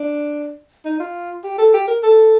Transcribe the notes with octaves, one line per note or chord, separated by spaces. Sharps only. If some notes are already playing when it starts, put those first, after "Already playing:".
Already playing: D4
D#4
F4
G4
A4
G4
A#4
A4